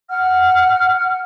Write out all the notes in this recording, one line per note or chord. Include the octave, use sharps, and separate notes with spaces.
F#5 F6